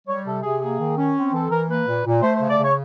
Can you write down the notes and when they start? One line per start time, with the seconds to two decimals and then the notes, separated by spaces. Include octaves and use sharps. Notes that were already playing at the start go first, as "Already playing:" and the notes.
0.07 G3 C#5
0.25 C3 A4
0.43 C3 G#4
0.60 A#3 G#4
0.79 D#3
0.97 C#4
1.15 C4
1.33 E3 A4
1.50 E3 A#4
1.68 A#3 B4
1.87 A#2
2.05 A#2
2.22 A3 C5
2.36 C5
2.41 C#3
2.50 D5
2.58 C#3
2.63 C#5